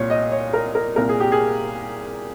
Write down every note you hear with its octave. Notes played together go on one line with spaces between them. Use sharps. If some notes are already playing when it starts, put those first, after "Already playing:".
Already playing: C2 A#2 C#5
D#5
C#5
A#4
A#4
C2 A#2 A#4
G#4
G4
G#4